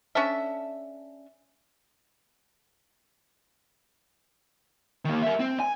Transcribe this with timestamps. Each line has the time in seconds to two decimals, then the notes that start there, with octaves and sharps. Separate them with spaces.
0.15 C#4 D4 A4 E5
5.05 D#3 A#3
5.22 A#4 E5
5.40 C4
5.60 G#5